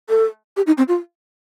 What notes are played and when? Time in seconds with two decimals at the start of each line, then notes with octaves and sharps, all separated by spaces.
0.09 A4
0.57 G4
0.67 D#4
0.78 C4
0.88 F4